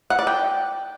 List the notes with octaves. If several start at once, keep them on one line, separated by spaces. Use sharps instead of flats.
F#5
D5
G5